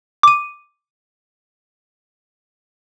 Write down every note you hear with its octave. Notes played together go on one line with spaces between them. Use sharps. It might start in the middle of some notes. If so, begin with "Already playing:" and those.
D6 D#7